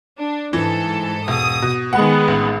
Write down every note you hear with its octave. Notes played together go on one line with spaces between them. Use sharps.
D4
G#2 E3 A4
E1 D#6
B2
D#3 G#3 B3 F#5
A1